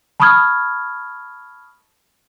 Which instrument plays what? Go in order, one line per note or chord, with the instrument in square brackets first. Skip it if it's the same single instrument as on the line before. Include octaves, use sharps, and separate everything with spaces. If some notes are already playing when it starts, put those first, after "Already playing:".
[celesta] A5 B5 C#6 D#6 F6 G#6